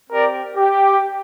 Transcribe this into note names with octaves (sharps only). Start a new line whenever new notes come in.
C4 G4 A#4 D5
G4